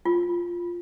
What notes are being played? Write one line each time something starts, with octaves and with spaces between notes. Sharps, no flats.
F4